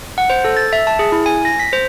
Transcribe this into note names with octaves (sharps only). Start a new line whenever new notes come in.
F#5
C5
A4
A6
E5
A5
G#4
E4
G#5
A#6
B6
C5